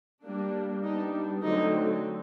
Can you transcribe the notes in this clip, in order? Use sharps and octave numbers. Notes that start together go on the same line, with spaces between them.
G3 A#3 D4
G3 B3 D4 D#4
D3 F#3 A3 C4 D#4